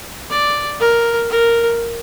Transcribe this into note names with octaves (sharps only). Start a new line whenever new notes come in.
D5
A#4
A#4